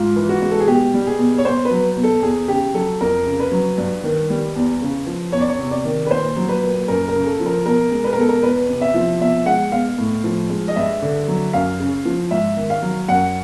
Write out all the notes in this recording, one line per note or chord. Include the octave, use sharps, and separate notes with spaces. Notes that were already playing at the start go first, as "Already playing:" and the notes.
Already playing: G#2 F4
E3
F#4
G#3
A4
G#4
B2 G4
G3
G#4
B2
C#5
B2 C5
B4
F#3
B2
A4
E2 G#4
C#3 G4
F#3 A4
F2 A#4
C#3
B4
F#3
G2
D#3
G3
E2
C#3
F3
E2 C#5
D5
C#5
C3
D5
D#3
B4
A#2 C5
F#3
B4
A#2
F#2 A#4
A#4
C#3
A4
F3
A#4
B2 A#4
G#3
B4
A#4
B2 A4
A#4
E2 B4
C3
E5
F3
B2 E5
G#3 F#5
B2 F5
A2
F3
G#3
D#5
G2 E5
D3
F#3
F#2 F5
C#3
F3
G#2 E5
D#3
F5
F#3
F#2 F#5